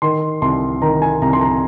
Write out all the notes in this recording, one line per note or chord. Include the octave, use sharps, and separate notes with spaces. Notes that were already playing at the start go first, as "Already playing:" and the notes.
D#3 C6
C2 C6
D#3 A#5
G#5
C2 A#5
C6
A#5